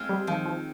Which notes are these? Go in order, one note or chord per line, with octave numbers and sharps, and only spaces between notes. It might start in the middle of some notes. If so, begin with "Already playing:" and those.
Already playing: G#3 C4 F4
G3
D#3 F3
F3